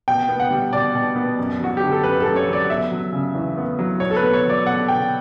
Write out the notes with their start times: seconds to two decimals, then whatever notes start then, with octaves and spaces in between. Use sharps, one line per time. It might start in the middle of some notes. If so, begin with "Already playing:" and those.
0.08 B2 G5
0.28 B3
0.40 F#5
0.51 G3
0.73 B2 D5
0.95 B2
1.16 B3
1.38 F#2
1.60 F#3 F#4
1.77 D3 G4
1.91 A4
2.04 F#2 B4
2.20 A4
2.26 F#2
2.36 C#5
2.48 F#3 D5
2.70 B3 E5
2.91 F#3
3.13 C#3
3.35 E2
3.58 B3
3.79 F#3
4.00 B2 C#5
4.11 A4
4.16 B4
4.23 B3
4.33 C#5
4.45 F#3 D5
4.66 B2 F#5
4.88 B2 G5